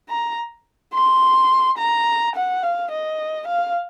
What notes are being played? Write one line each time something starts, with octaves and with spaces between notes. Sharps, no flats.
A#5
C6
A#5
F#5
F5
D#5
F5